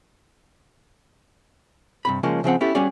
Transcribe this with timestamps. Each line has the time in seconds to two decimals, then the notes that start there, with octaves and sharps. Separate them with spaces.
2.05 G2 C3 B5
2.23 C#3 F3 G#3 A#3 C#4
2.44 C#3 F3 C4 F#5
2.61 B3 C#4 E4 G4 A4
2.75 G3 B3 C#4 F#4 G#4 D5